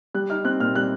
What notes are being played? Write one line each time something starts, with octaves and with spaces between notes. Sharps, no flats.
G3 F#6
D#4 F6
C4 F#6
A#2 F6
G3 F#6